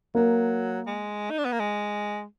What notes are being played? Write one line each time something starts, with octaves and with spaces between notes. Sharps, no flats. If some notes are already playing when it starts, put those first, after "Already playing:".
F#3 A#3
G#3
D#4
D4
B3
A#3
G#3